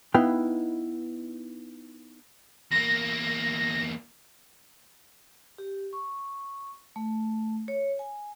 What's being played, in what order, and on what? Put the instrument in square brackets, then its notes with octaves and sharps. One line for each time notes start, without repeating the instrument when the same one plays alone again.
[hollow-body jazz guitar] B3 D#4 E4 B4 F5 G5
[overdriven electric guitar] E2 A#3 [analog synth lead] A#6
[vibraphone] G4
C#6
A3
C#5
G#5